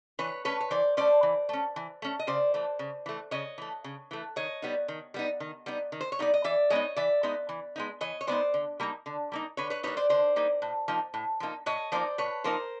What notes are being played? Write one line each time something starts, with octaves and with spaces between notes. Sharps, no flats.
E3 B4 C#5
A3 C#4 B4 C#5
C#5
E3 C5 D5
A3 C#4 C5 D5
E3
A3 C#4
E3
A3 C#4
D#5
C#3 C5 D5
E3 A3
C#3
E3 A3
C#3 C#5 D#5
E3 A3
C#3
E3 A3
D#3 C#5 D#5
G3 B3 D#4
D#3
G3 B3 D#4
D#3
G3 B3 D#4
D#3
C5
C#5
G3 B3 D#4 D5
D#5
E3 D5 E5
G#3 B3 D#4 C#5 D#5
E3 D5 E5
G#3 B3 D#4
E3
G#3 B3 D#4
E3 C#5 D#5
C#5
G#3 B3 D#4 C5 D5
D3
G3 A#3 D#4
D3
G3 A#3 D#4
D3 B4 C#5
B4 C#5
G3 A#3 D#4 B4 C#5
C5 D5
D3 C5 D5
G3 A#3 D#4
A2
F3 A#3 D#4
A2
F3 A#3 D#4
A2 C#5 D#5
F3 A#3 D#4 C5 D5
A2 B4 C#5
F3 A#3 D#4 A#4 C5